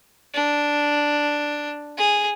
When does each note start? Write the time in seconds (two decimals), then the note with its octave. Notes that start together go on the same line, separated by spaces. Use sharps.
0.34 D4
1.98 G#4